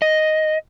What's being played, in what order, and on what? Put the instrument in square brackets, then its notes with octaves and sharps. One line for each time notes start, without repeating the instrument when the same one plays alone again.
[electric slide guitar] D#5